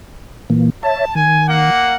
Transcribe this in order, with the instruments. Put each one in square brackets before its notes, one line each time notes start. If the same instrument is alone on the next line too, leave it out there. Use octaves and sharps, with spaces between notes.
[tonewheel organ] A#2 E3 A#3
[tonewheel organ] C#5 E5 [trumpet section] A5
[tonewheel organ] D#3 [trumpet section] G#5
[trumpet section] A#3 F#5